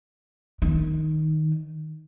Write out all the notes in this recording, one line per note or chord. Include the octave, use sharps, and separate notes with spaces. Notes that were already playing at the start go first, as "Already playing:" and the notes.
D#3